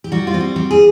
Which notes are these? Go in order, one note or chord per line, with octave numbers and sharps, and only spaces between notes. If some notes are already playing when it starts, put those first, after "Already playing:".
G4
G3 F#4
F4
C4
F#4
G3
G#4